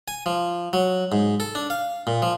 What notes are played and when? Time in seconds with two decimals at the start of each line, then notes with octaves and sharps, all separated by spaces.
0.08 G#5
0.26 F3
0.73 F#3
1.12 G#2
1.40 A4
1.55 D4
1.70 F5
2.07 A#2
2.22 F3